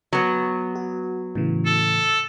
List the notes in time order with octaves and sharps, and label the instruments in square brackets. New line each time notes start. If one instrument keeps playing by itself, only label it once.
[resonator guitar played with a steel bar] F#3 B3
[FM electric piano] F#4
A2 C#3 E3
[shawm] A4